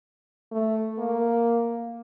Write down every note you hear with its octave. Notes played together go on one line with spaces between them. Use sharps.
A3
A#3